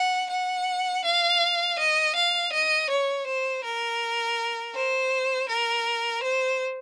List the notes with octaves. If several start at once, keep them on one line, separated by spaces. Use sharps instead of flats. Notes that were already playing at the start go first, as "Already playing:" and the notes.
Already playing: F#5
F#5
F5
D#5
F5
D#5
C#5
C5
A#4
C5
A#4
C5